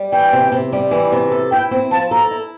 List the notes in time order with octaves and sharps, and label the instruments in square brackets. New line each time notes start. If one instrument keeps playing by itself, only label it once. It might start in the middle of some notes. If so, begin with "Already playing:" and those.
Already playing: [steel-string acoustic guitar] G3
[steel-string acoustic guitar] E3 [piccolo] G5
[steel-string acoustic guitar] C3
C3
G3
E3
C3
A4
[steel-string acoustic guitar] E4 [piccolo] G5
[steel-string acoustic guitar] C4
[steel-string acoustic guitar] F3 [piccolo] A5
[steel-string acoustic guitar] A4 [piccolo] A#5
[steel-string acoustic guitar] E4